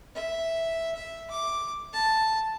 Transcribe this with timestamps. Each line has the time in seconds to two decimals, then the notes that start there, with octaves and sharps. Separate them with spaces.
0.15 E5
0.96 E5
1.31 D6
1.93 A5